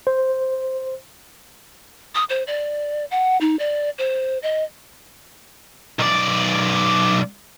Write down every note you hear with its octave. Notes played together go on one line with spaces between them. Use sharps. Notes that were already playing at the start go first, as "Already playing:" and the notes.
C5
D#6
C5
D5
F#5
D#4
D5
C5
D#5
B1 D5